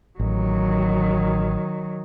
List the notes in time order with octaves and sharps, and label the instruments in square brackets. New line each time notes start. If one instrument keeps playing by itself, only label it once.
[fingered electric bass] A1 [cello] D#3 F#3